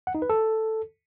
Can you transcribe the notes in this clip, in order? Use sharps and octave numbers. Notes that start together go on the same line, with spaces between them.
F#5
D#4
B4
A4